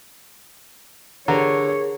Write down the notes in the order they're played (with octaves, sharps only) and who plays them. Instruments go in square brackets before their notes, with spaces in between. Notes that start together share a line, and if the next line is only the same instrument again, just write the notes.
[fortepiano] D3 [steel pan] G4 B4 A#5 [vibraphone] G#4 A#4 [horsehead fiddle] C#5